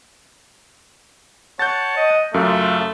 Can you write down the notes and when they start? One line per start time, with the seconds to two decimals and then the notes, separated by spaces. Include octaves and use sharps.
1.59 C#5 F#5 A5 G6 A6
1.97 D#5
2.34 F#2 C#3 A3 F4 A4